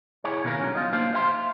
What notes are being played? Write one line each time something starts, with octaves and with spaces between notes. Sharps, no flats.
E4 G4 G#4 C#5
B2 D#3 B3 F4 A#4
D3 F#3 C#4
D#4 F4
A#3 D4 G4 C5 F5
C5 E5 F5 G5 C6